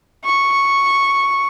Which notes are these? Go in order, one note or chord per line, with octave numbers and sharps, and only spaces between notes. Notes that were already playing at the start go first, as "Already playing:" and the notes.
C#6